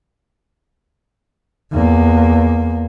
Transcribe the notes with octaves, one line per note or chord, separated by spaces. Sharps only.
E2 A#3